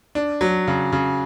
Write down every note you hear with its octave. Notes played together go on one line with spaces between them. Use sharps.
D4
F#3
C#3
C#3